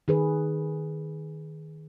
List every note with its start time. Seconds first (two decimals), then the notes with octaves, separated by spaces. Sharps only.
0.08 D#3 G#4 B4